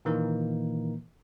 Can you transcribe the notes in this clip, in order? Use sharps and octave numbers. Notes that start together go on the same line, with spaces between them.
A#2 D#3 E3 A#3 D#4 A#4